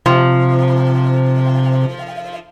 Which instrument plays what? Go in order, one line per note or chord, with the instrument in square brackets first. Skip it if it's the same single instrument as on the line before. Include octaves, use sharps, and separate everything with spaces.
[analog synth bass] C3 [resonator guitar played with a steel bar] F3